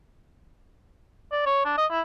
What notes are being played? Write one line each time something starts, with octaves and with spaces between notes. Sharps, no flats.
D5
C#5
D4
D#5
E4